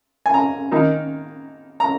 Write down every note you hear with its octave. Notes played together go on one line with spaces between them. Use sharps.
G#5
A#5
D#3 A#3 D#4
A#5